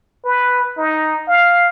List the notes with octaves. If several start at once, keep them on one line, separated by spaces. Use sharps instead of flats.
B4
D#4
F5